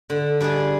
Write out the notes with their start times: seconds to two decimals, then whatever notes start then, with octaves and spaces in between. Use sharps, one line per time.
0.10 D3
0.41 G3 D4 G#4